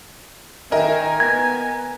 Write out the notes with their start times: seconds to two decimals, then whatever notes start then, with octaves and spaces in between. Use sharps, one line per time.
0.72 D#3 A#4 D#5 E5 G#5
1.20 B3 G#6 A#6